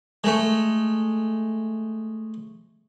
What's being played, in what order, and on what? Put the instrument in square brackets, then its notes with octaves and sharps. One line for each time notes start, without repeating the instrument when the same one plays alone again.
[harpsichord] G#3 A3